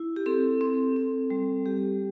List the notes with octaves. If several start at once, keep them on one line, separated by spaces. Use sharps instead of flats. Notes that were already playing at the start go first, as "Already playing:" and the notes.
Already playing: E4
G4
C4 A4
C4
C4
G3
G3 G4